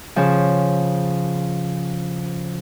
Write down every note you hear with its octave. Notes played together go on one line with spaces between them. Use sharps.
C#3 F3